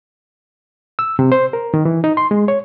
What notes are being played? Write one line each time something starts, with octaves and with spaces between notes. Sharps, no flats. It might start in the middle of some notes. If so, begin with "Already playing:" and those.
E6
C3
C5
A#4
D#3
E3
D#4
C6
G#3
C#5